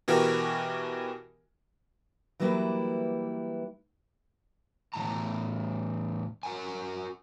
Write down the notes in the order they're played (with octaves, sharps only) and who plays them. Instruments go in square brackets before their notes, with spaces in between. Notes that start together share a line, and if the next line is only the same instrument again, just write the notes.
[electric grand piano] B2 E3 F#4 G4 A#4
[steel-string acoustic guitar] E3 F#3 G3 A#3 E4 B4
[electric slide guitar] E2 A2 A5 A#5
F#4 A#4 F#5 G#5